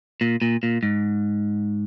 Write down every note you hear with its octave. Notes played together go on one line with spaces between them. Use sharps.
A#2
A#2
A#2
G#2